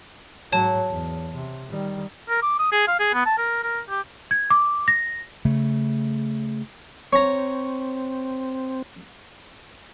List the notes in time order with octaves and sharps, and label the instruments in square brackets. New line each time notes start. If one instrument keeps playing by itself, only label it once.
[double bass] G#2 F#3 [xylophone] C#5 A5
[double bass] E2
C3
D#3 G3
[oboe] A#4
D6
D#6
G#4
F5
G#4
B3
A5
A#4
A#4
G4
[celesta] G#6
D6
A#6
[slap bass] C#3 A3
[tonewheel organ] C4 [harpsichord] C#5 A#5